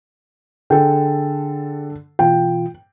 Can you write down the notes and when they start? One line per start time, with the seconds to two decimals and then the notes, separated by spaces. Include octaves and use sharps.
0.70 D3 G#4 A4 G5
2.19 B2 E3 F4 G5